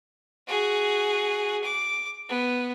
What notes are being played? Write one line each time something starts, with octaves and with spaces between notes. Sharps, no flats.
F#4 G#4
D6
B3